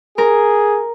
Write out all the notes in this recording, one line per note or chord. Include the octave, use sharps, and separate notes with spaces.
G#4 A#4